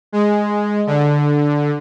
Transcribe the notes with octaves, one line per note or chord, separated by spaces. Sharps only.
G#3
D3